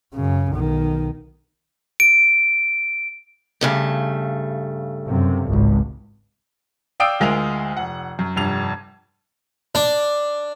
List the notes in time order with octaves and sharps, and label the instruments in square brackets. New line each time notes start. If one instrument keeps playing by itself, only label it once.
[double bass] F#2 C#3
B1 D#3
[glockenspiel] D7
[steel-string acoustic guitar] G2 C#3 A3
[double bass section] F#2 C3
G#1 C#2
[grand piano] D5 F5 G5 D#6 E6 D7
D2 G#3 F4 A#4 F7
F1 F#5
F#2
F1 G2 F7
[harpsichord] D4